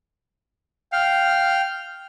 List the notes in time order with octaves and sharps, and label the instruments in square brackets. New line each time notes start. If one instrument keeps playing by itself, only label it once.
[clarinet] F5 [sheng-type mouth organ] G5 F6